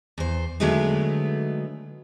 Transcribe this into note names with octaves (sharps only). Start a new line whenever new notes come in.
E2 C5
D3 F#3 G#3 A3 B3 D#4